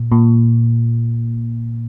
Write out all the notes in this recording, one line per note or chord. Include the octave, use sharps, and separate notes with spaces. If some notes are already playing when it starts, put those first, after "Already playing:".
Already playing: A#2
A#2